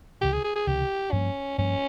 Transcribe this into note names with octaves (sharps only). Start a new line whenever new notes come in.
C#2 C3 E3 G4
G#4
G#4
G#4
C#2 C3 E3 G4
G2 F3 A#3 C#4
G2 F3 A#3 C#4